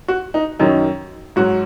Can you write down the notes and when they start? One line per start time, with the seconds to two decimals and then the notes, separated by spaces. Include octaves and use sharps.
0.08 F#4
0.34 D#4
0.59 F#2 D#3 F#3 D#4
1.36 G#2 F#3 F#4